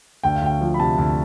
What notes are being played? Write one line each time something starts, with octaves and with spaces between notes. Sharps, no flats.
D2 G5
F5
D2 G5
F3
B5
C3 A5
D2